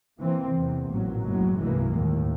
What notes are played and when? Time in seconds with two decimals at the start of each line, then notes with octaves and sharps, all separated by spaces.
0.20 E3 A#3 C4
0.53 E2 C3
0.91 A1 A#2 F#3
1.23 F#1 B1 A2 F#3 G#3
1.61 G1 C2 E3 G#3 A#3
1.92 D#2 A2